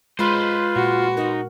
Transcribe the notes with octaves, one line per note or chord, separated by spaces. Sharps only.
G#3 F4 B4 C5
A#2 F#4
D#4 A#4